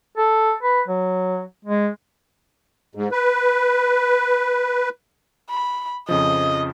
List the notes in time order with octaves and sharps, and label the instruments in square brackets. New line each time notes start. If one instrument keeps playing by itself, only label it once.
[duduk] A4
B4
F#3
G#3
[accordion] G#2
B4
[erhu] B5
[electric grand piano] F2 C#3 F3 [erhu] D#5